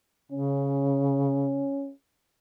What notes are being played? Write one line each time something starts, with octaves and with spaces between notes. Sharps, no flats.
C#3 C#4